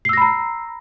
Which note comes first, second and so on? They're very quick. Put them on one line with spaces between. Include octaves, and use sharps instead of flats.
C7 E6 A#6 B5 A#5